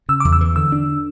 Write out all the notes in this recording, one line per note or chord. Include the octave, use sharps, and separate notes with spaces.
C#3 E6
D6
E2
E6
E3
D3 E6
D4